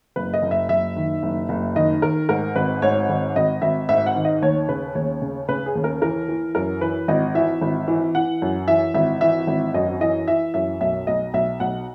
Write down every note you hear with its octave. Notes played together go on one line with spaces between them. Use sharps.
F#1 B4
D#5
F#1
E5
F#1 E5
D#3
F#1
F#1
D#3 D#5
D#3 A#4
G#2 A#4
G#1 B4
G#2 C#5
G#1
G#1 D#5
G#1 E5
G#2 E5
F#5
D#3
D#5
D#2 C#5
C#3 B4
D#2 C#5
C#3
C#3 B4
G#4
D#2
A#4
E3 A#4
E3
F#2 A#4
E3 B4
G#1 D#5
E3 E5
G#1
E3
E3 F#5
F#2
E3 E5
G#1 E5
E3 E5
G#1
F#2 D#5
E3 D#5
E3 E5
F#2 E5
B1 E5
B1 D#5
B1 E5
B1 F#5